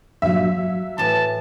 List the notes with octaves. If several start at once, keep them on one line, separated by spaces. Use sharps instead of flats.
G2 A#2 F#3 E5 F5
F#3
A2 E3 A5